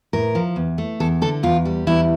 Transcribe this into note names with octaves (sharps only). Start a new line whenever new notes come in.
A2 A#4
F3
E2
A3
E2 A4
D3 A4
E2 F4
G3
E2 E4